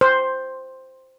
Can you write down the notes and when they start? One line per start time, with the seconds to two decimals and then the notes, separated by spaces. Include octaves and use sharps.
0.01 C5